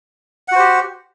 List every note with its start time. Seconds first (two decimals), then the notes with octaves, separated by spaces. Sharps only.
0.48 F#5
0.52 F#4
0.56 C5
0.59 G4